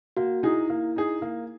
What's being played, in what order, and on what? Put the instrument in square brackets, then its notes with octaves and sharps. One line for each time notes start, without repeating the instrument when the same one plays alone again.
[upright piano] A#3 [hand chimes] F#4
[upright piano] D#4 G#4 [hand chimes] E4
[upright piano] A#3
D#4 G#4
A#3